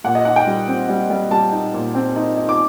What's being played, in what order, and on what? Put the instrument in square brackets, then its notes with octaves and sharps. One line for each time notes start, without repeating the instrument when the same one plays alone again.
[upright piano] A#2 F#5
D#5
D#4 F#5
G5
G3
C4
G3
G3
G3 A5
D#4
A#2
C4
D#4
D#4
D6